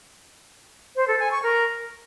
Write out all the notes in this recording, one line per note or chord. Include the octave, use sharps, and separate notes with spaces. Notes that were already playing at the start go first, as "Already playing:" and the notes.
C5
A4
G#5
C#6
A#4